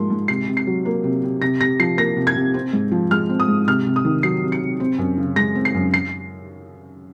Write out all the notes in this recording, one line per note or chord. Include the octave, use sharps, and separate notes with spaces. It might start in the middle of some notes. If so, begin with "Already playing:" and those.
Already playing: G#2 F3 A#3 C6
G#2
C3 C7
C3
C7
F#3
A#3
C3
C3
C3 A#6
C3 A#6
F3 C7
A#3 A#6
C3
G#6
C3
C4
G#2
F3
G#3 F6
C4
D#6
G#2
C3 F6
C3
D#6
D#3
F#3 C7
C3
C#7
C3
C4
F#2
C#3
G#3 A#6
C4
C7
F#2
C7